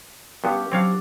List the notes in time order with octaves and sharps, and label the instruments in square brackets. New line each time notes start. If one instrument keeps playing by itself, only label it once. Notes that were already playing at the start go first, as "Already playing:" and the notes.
[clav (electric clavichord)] G2 B3 [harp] C#4 G4
[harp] F#3 D4 [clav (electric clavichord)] C4 C#5 F5